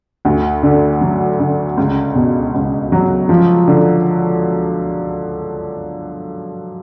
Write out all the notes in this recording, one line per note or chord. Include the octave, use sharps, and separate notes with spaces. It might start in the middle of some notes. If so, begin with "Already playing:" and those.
D2
D3
F#3
D3
C#2
B2
C#2
F#3
F3
D3